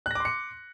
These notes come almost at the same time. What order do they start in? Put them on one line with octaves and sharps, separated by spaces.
F#6 A#6 D6 C6 C#7